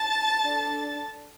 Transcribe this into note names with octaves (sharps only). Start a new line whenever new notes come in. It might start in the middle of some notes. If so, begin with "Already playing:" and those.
Already playing: A5 A6
D4 A4